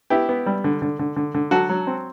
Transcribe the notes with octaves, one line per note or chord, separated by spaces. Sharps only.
B3 E4 G4
B3
G3
D3
D3
D3
D3
D3
F#3 F#4 A4
F#3
C4